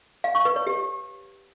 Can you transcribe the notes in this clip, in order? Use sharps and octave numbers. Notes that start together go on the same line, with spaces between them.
F5
C#6
B4
C#5
G4